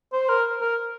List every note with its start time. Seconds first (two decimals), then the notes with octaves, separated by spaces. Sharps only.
0.13 C5
0.29 A#4
0.61 A#4